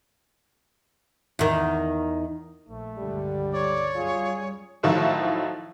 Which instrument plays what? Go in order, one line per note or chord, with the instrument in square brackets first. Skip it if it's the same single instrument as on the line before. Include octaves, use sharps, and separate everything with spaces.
[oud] E2 D#3
[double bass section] A#1 [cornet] A3
[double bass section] C#2 G2 D3 [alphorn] G3
[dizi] C#5 [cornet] D5
[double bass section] F#2 G3 [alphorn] F4 [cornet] G#4
[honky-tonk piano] A2 D#3 F3 F#3 E4 F#4